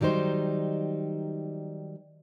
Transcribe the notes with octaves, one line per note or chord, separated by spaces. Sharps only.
D#3 F#3 G3 D#4 C5